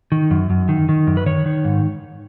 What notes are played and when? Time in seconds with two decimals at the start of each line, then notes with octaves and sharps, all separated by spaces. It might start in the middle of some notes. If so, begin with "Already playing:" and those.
0.12 D#3
0.31 F#2
0.50 F#2
0.69 D#3
0.89 D#3
1.07 F#2
1.17 B4
1.26 D#3 C#5
1.46 D#3
1.64 G#2